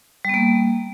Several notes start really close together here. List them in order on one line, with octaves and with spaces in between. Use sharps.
G3 B3 A#3